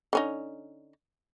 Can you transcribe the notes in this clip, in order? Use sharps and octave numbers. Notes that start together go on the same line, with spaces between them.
D3 C#4 D#4